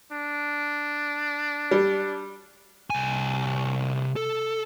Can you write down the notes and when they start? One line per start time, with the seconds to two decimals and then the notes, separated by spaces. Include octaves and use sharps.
0.12 D4
1.71 G3
2.90 C2 G#5
4.16 A4